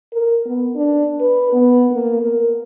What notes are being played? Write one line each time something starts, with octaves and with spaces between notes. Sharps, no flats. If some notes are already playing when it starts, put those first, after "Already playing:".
A#4
B3
D4
B4
B3
A#3
A#4